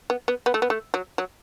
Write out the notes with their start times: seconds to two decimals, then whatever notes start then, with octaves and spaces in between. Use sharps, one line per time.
0.10 B3
0.28 B3
0.46 B3
0.54 A3
0.62 B3
0.70 A3
0.94 F#3
1.18 F#3